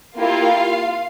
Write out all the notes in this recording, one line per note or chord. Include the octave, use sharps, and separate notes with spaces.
A#3 E4 F4 G4 F5